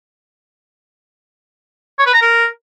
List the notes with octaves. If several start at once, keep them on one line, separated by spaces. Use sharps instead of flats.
C#5
B4
A#5
A#4